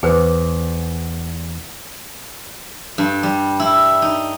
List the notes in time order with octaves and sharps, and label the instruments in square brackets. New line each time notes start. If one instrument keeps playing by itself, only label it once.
[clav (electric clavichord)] E2 [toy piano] G#4 B4 C5
[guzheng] G2
G3
E4
D#4